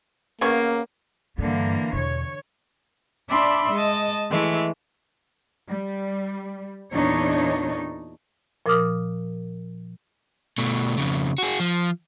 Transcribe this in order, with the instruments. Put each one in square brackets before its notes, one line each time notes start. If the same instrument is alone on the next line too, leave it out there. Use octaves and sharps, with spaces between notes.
[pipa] C#3 B3 C#6 [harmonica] A#3
[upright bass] G2 [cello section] D3 E3 A#3
[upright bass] E2 B2 [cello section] C#5
[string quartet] D4 D5 E5 B5 C6
G#3 D#5 A5
E3 G#3 A3
[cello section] G3
E2 A#2 E3 D4 D#4 C#5
[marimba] A#2 F3 A#4 D6 D#6 F6
[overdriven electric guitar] B2 A3
F2 C#3
F#4 G#4
F3